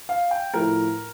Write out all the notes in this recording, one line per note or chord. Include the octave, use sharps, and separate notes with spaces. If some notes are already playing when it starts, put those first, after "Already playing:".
F5
G5
A2 F3 A3 E4 A#4